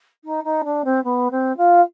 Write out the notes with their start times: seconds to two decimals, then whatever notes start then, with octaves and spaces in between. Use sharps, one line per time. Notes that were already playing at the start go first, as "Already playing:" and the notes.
0.24 D#4
0.44 D#4
0.64 D4
0.84 C4
1.04 B3
1.31 C4
1.57 F4